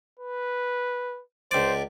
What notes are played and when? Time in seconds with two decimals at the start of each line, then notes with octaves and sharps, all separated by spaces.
0.19 B4
1.51 C#2 C5 D5